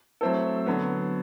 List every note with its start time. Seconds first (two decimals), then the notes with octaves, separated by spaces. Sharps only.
0.21 F#3 A3 C4 E4 A4
0.66 D3 F#3 B3